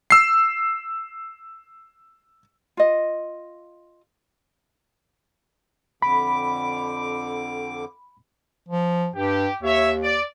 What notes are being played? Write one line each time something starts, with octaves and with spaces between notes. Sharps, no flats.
E6 C7
F4 D#5
F2 D3 B5 D6
F3
G2 G4
D#2 C#5 E5
D5